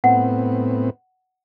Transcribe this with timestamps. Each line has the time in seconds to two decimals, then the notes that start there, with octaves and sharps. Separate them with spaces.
0.04 A2 B3 C4 F#5